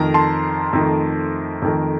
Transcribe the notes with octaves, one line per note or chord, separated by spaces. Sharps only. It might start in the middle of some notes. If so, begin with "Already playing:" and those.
Already playing: F2 D#3 A3 A#5
A5 C6
F2 D#3 A3
F2 D#3 A3